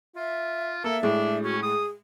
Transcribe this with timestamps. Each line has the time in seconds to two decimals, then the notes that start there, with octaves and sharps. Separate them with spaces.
0.16 F4 E5
0.84 A#3 A4 E5
1.03 A2 G#3 D4
1.43 C#4 F#4
1.63 G#4 D#6